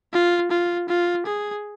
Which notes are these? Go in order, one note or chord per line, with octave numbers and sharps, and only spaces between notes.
F4
F4
F4
G#4